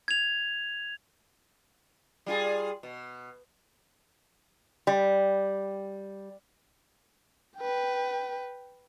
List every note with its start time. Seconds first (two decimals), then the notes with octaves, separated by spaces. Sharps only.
0.08 G#6 F7
2.26 G3 F4 G#4
2.83 B2
4.87 G3
7.58 B4 G5